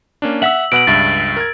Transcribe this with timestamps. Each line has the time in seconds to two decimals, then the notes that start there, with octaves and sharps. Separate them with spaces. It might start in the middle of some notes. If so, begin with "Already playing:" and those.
0.22 A#3 C#4 D4
0.42 E5 F#5 E6 B6 F#7
0.72 B2 B4 F#5 D7 F#7
0.87 C#2 G2 E5 A6
1.37 A#4 G#6